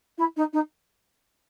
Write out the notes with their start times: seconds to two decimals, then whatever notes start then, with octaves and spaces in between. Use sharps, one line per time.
0.18 E4
0.36 D#4
0.53 D#4